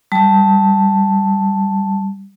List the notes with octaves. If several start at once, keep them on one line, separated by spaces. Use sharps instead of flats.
G3 A5